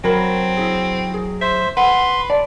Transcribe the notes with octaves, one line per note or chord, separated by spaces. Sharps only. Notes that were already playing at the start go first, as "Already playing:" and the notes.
F#3 C4 A#4 B5
E4 G#4
G#4
C5 E5
B4 F#5 C6
D5 A5